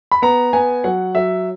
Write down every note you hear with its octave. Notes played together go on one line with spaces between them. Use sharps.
B5
B3 A#5
B3 G#5
F#3 F#5
F#3 E5